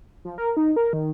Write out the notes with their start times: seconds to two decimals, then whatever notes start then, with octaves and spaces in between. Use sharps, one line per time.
0.25 F3
0.38 A#4
0.57 D#4
0.76 A#4
0.93 D#3